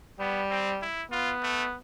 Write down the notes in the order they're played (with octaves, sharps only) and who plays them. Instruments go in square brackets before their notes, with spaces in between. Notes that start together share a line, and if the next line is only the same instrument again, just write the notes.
[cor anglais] G3 [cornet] B3
[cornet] C4
E4
[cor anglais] B3 [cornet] F4
[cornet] A3